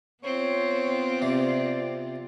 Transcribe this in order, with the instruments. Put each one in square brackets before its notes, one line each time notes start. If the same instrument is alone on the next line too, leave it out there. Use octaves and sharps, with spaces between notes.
[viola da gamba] B3 F4 [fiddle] C4 [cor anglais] C#5
[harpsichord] C3 [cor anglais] D5